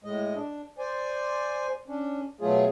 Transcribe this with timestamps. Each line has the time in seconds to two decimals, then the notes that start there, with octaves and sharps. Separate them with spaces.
0.04 A2 G#3 D#5
0.35 D4
0.78 C5 D5 G#5
1.88 C#4 D4
2.41 B2 F#3 A3 F4 G#4